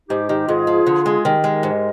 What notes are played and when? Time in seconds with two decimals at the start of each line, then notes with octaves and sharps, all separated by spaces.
0.09 G#2 D#4 G4
0.29 D#3 D#4 G4
0.48 G#2 F4 G#4
0.67 F3
0.86 D3
1.06 G#3
1.24 D#3 G4 A#4
1.44 G#3
1.63 G#2